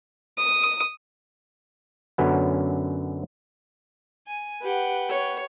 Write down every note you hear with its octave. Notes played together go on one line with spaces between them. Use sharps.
D#6
F#2 D3 F#3 B3 C#4
G#5
G4 B4 F#5 G5
C#5